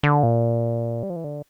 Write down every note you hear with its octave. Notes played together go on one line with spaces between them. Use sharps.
D3
A#2
G3
F3
E3
D3